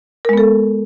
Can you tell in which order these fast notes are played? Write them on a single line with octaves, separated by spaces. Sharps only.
A#4 G#3 B3 A4